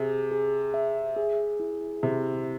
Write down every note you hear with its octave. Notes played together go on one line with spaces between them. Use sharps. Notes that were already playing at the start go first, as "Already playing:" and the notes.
Already playing: C3 G#4
G#4
E5
G#4
E4
C3 E4